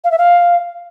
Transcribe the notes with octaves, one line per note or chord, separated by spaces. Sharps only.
F5
E5
F5